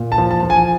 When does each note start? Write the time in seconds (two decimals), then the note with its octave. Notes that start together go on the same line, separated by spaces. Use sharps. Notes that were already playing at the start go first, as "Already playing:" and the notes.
Already playing: A#2
0.12 A5
0.18 F3
0.31 A5
0.43 F3
0.50 G#5